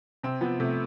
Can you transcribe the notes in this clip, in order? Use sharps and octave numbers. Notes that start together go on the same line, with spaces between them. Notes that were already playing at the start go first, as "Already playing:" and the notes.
C3 C4
F3 B3
C3 A3